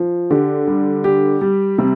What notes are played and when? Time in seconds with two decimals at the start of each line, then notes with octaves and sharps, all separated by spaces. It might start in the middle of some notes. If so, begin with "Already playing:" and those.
Already playing: F3
0.30 D3 G4
0.67 G3
1.04 G4
1.41 G3
1.78 C3 G3